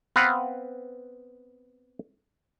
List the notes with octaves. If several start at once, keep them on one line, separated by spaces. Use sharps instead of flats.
B3 C4 B4 F5 F#5